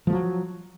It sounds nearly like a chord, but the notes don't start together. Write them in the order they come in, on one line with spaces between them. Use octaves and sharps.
F3 A3 F#3